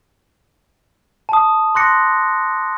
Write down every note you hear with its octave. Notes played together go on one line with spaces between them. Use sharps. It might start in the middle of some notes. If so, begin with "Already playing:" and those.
A5 D#6
C6 D6 F#6 A#6 C#7